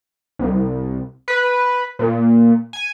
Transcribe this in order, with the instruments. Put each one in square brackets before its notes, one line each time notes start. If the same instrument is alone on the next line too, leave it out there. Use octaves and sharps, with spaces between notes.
[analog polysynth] C2
B4
A#2
G#5